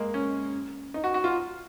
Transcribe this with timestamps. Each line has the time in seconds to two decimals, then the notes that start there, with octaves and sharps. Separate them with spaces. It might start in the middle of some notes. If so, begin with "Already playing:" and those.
Already playing: G#3 A#3
0.14 C#4
0.94 D#4
1.04 F#4
1.14 F#4
1.24 F4